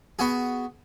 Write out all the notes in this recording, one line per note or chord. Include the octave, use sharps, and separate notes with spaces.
B3 F#4 G#4